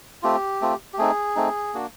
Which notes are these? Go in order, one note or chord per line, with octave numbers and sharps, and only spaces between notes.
A3 C4 F4 G4
A3 C4 F4
G4
A3 C4 D#4 G#4
A3 C4 D#4
A#3 D4 F#4